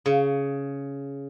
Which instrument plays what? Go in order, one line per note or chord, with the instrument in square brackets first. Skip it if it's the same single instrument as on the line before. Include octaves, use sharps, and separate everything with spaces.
[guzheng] C#3